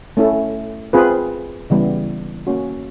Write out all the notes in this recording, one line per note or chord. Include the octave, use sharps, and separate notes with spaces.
A3 C#4 E4 A4
C4 F4 G#4 B4
C#3 E3 G3 B3
A#3 C#4 F#4